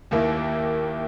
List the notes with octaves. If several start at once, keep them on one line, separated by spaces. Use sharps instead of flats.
D#2 D#3 A#3 E4